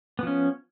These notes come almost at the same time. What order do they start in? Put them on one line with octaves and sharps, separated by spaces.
B3 F3 C#4